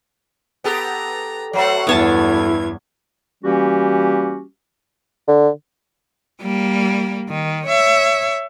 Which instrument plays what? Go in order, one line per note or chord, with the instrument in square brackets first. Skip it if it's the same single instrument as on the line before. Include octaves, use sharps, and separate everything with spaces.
[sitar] B3 G4 A4 [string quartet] A#5
[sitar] F#3 A3 [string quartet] C5 F#5
[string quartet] E2 G2 G#6 [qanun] B3 C#5 A5 [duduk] E4
[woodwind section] E3 G3 A#3 C#4 F#4 G4
[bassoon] D3
[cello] G3 A#3
D#3
C#5 E5